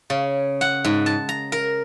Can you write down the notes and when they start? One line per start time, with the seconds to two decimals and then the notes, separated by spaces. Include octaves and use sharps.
0.10 C#3
0.61 F#5
0.84 G#2
1.06 A5
1.29 A#5
1.52 A#4